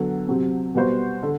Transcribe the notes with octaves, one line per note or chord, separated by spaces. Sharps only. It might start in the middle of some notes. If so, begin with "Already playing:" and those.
Already playing: D3 F#3 B3
C3 F#3 C4
B2 G3 B3 F#4 C5
D3